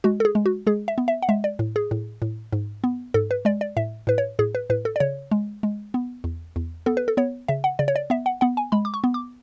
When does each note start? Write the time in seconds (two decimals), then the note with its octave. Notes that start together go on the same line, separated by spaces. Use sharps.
0.04 G#3 F#4
0.20 A4
0.25 G#4
0.35 G#3
0.46 F#4
0.67 G#3 G#4
0.88 E5
0.98 B3
1.08 E5
1.22 F#5
1.29 G#3 E5
1.44 D5
1.59 A2
1.76 G#4
1.91 A2
2.22 A2
2.53 G#2
2.84 B3
3.14 G#2 A4
3.31 B4
3.45 G#3 D5
3.61 D5
3.77 A2 E5
4.07 A2 B4
4.18 C#5
4.39 A2 G#4
4.55 B4
4.70 A2 B4
4.85 A4
4.96 D5
5.00 C#3 C#5
5.31 G#3
5.63 G#3
5.94 B3
6.24 E2
6.56 E2
6.86 B3 A4
6.97 B4
7.08 A4
7.17 B3 C#5
7.48 C#3 E5
7.64 F#5
7.79 C#3 D5
7.88 C#5
7.96 D5
8.10 B3 E5
8.26 F#5
8.41 B3 F#5
8.57 G#5
8.72 G#3 B5
8.85 D6
8.94 C#6
9.04 B3
9.14 D6